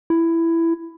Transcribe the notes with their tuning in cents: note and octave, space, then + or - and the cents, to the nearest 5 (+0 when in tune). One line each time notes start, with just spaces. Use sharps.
E4 +10